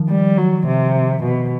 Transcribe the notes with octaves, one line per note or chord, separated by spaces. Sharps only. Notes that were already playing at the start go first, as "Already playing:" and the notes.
Already playing: D#3 F3
G3
F#3
C3
B2